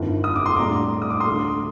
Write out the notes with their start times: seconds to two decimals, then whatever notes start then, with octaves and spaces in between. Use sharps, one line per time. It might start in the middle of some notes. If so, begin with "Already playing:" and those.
Already playing: G1 F2 D#3
0.24 D#6
0.36 D6
0.46 C6
0.57 A2 G3 D4 A#5 D6
1.02 D#6
1.10 D6
1.20 C6 D#6
1.26 D2 D3 A3